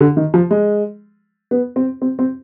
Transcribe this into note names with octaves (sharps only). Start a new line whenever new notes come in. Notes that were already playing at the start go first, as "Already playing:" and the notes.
D3
D#3
F3
G#3
B3
C4
C4
C4